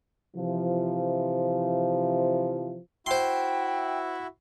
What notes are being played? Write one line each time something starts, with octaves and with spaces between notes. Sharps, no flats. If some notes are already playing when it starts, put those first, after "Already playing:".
C3 E3 F3
E4 F#4 C5 E5 G5 C6